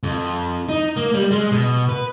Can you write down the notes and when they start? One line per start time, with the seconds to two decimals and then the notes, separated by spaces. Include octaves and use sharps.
0.03 F2
0.69 D#4
0.96 A#3
1.14 G3
1.31 G#3
1.51 B2
1.89 B4